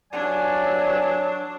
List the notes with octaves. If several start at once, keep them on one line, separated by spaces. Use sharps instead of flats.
G2 F#3 D4 D5 G#5